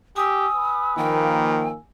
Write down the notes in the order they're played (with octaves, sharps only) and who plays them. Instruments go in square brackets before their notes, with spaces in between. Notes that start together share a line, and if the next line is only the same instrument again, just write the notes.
[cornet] G4 [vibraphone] G#5 E6 [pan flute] D#6
[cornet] B4
[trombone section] D#3 F3 A#3 [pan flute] G5